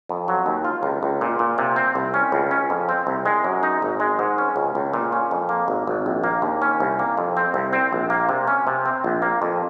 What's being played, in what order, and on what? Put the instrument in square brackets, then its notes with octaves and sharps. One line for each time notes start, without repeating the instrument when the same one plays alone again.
[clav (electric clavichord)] F2
F#3
D#2
F4
C#2
C#2
A#2
A#2
C3
C4
C2
C#4
C#2
C#4
F2
C4
C2
G#3
F#2
D#4
G#1
G#3
G#2
C#4
C#2
C#2
A#2
C#4
F2
A#3
G#1
G#1
A#1
A#3
D#2
C#4
C2
A#3
F2
C4
C2
C4
A#1
A#3
C3
C#4
C3
C4
A#1
A#3
F2